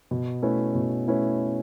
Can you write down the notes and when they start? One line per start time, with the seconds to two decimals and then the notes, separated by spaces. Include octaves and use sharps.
0.11 B2
0.42 A3 C#4 E4 B4
0.75 B2
1.07 A3 C#4 E4 B4